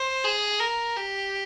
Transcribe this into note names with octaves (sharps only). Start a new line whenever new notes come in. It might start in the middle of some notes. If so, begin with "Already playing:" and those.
Already playing: C5
G#4
A#4
G4